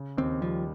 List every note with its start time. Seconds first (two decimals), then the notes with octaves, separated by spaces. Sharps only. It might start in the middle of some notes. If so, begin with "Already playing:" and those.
Already playing: C#3
0.18 D#2 C4
0.42 F3 G3